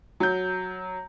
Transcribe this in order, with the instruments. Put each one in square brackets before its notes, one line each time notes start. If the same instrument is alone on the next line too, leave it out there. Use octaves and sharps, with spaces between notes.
[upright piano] F#3 G6